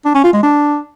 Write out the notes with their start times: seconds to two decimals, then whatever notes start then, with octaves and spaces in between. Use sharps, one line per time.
0.05 D4
0.15 C#4
0.24 F4
0.33 G#3
0.43 D4